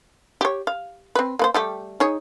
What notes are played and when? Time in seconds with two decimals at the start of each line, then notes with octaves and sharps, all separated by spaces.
0.41 G4 C#5
0.67 F5
1.15 C4 B4
1.39 A#3 B4 C5
1.54 G3 A3 G4
2.00 D#4 G#4 C#5